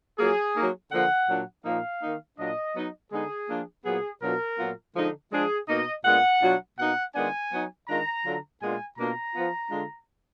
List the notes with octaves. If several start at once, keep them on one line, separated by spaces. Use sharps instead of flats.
F#3 A#3 F4 G#4
F#3 A#3 D#4
D3 F3 A#3 F#5
A#2 F#3 D4
A#2 F3 A#3 D#4 F5
D#3 A#3 D#4
A#2 F#3 D4 F4 D#5
F#3 B3 D#4
D3 G#3 B3 D#4 G#4
F3 A#3 D4 F4
A#2 F#3 B3 G#4
B2 F#3 D4 F4 A#4
A#2 F#3 B3 F4
D3 F3 G#3 D#4
F3 G#3 D4 G#4
B2 A#3 D#4 D#5
A#2 G#3 B3 D4 F#5
B2 F#3 D4 F4
B2 A#3 D#4 F#5
D#3 G#3 B3 D4 F4 G#5
F#3 B3 D#4
D#3 G#3 D4 F4 A#5
D3 F#3 D4 F4
A#2 G#3 B3 D4 F4 G#5
B2 A#3 D4 F4 A#5
F3 B3 F4
D3 G#3 D4 F4